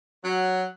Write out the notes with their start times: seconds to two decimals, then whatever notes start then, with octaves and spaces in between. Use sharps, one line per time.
0.24 F#3